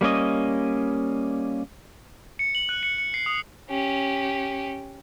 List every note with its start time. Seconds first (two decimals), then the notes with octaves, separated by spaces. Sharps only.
0.01 G3 A#3 C#4 D#5
2.39 C#7
2.55 F#7
2.69 F#6
2.83 C#7
2.98 C#7
3.14 C7
3.26 D#6
3.70 C#4 G4